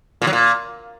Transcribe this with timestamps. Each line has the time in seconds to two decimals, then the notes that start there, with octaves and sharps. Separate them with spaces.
0.22 A#2
0.27 F#3
0.33 A#2